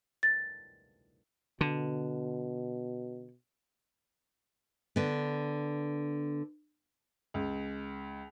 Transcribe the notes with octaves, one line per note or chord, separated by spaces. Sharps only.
A6
B2 D3
D3 B3
C#2